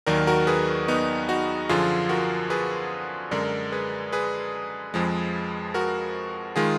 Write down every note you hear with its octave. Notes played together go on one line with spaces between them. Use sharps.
D#2 D#3 F#3 A#4 D5
F#4 A#4
G#4 B4
B3 D#4
D#4 F#4
F#2 D3 F3 F4 G#4
F#4 A#4
G#4 B4
F#2 D3 G#3 A#4 D5
G#4 B4
G#4 B4
F2 F3 G#3
F#4 A#4
D#3 G#3 F4 G#4